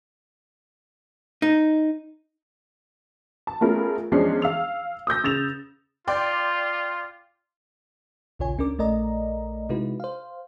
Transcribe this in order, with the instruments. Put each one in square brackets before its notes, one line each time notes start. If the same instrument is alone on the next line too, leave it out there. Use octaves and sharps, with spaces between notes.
[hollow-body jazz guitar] D#4
[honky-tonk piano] A5
A3 B3 C#4 F4 G#4 A#4
E2 F3 G#3 C#4 D4 C7
F5 E6 F7
D#6 E6 G6 A#6
C#3 A6 E7 F7
[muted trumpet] F4 [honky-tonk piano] D5 G5 C6
[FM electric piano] A#1 D#2 C#3 F4 C#5 G#5
D2 C#4 D4 A#4 D6
A#1 A3 A#4 D5 D#5 A#5
C3 G#3 D#4 E4 F#4 B4
C5 F5